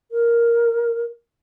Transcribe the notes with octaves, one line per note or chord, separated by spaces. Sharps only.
A#4